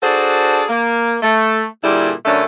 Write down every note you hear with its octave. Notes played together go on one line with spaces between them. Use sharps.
D4 F#4 G#4 A4 C5
A#3
A3
A#2 D3 G3 E4 G#4
F#2 D3 A3 C#4 D4